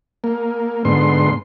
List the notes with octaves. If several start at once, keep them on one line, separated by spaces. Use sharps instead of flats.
A#3
G#2 D3 B3 C6